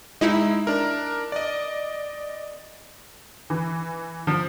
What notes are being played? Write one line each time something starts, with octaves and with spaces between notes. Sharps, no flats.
G#3 D#4 E4
D4 A#4
D5 D#5
E3
F3